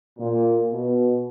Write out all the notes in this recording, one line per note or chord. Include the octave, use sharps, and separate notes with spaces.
A#2
B2